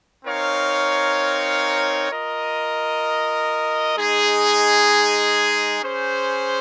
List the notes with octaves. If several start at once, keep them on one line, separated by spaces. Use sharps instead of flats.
C4 D#4 A#4 C#5 F5
F4 A#4 D#5
G#3 D#4 G#4
C#4 G#4 C5